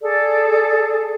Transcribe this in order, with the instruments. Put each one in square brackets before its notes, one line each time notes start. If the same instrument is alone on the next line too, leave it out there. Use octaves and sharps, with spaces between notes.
[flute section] G#4 A4 D5